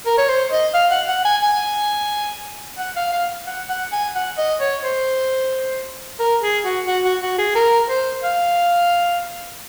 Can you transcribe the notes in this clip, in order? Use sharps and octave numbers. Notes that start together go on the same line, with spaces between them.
A#4
C#5
C5
D#5
F5
F#5
F#5
G#5
G#5
F#5
F5
F5
F#5
F#5
G#5
F#5
D#5
C#5
C5
A#4
G#4
F#4
F#4
F#4
F#4
G#4
A#4
C5
F5